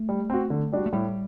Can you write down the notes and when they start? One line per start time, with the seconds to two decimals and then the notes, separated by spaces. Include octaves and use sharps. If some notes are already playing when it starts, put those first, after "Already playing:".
Already playing: A3
0.09 G3
0.30 C4 F#4
0.50 D3
0.72 G3 D4 F#4
0.86 A3
0.93 A2 G3